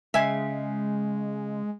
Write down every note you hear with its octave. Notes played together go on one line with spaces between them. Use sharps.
C#3 G#3 E5 G#5